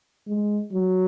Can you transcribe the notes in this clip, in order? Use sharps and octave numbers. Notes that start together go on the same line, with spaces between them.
G#3
F#3